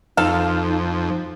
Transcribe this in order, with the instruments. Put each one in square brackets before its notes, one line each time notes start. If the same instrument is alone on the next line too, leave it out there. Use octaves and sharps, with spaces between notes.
[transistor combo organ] F2 [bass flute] D#4 [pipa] A4 F5